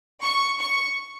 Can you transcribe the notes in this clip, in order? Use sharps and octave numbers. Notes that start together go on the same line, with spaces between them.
C#6
C#6